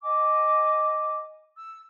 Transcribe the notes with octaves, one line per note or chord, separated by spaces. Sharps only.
D#5 G#5 D6
E6